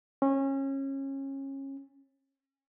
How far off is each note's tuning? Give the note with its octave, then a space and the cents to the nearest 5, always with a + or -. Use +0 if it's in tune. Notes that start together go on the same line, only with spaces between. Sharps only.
C#4 -25